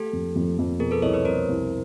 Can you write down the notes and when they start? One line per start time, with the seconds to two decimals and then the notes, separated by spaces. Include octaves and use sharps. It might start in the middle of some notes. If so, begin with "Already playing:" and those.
Already playing: A3 G4 A4
0.13 F2
0.36 F2
0.58 F2
0.80 B2 G#4 A#4
0.91 A4 B4
1.02 C2 C#5 D#5
1.14 B4 C#5
1.25 C2 A#4 C5
1.48 C2